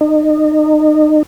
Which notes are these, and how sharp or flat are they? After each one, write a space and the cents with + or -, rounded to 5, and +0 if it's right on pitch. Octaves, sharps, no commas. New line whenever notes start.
D#4 -30